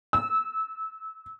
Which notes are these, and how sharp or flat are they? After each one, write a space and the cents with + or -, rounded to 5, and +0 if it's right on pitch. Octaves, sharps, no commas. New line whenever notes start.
E6 -25